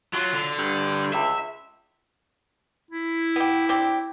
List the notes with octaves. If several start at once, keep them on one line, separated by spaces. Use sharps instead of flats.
F#3 F4
D3
G2
C#2 E5
E4
B3 G4
C4 D4 G4